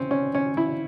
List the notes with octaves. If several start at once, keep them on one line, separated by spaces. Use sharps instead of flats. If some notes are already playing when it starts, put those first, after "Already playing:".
Already playing: C4 C#4
C#4
C#4
E4